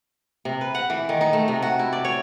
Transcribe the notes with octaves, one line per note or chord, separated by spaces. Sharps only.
C3
B4
F#5
E3
D#3
D#4
A3
C3
F#4
E4
D5
C#5